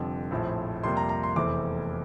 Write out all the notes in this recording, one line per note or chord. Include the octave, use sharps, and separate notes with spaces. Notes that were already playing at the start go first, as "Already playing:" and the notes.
Already playing: F1 F2 D3 G3 C4
A#1 A2 F3 C4
F2 C3 G3 A#3 C6
A#5
A#5
C6
F1 E2 E3 A3 C4 D6